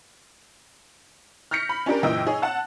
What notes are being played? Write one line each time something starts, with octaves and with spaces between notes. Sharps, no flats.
F6 G6 A#6 B6 C#7
B5
C#4 D4 G4 A#4
F#1 A#2 E3 D#5 G5 E6
D#4 G#4 C#5
F#5 A5 F#6